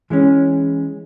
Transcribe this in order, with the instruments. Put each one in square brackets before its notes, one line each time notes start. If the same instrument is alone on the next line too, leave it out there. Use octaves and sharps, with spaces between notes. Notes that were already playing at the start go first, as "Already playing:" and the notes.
[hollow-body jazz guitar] E3 G#3 C#4